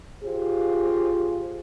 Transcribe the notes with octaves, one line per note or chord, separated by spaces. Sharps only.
F4 G4 G#4 C5